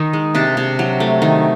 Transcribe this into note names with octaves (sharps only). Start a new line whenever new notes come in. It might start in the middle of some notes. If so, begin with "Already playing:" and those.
Already playing: D#3 D#4
G#3
C3 D4
C3
F#3
A3
D#3